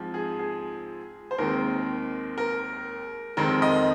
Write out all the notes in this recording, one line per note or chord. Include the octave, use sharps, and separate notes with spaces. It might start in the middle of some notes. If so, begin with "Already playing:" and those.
Already playing: G#2 F3 C4
G#4
G#4
C5
D#2 D#3 G#3 C4 A#4
A#4
F2 D#3 G#3 C4 A#4
D#5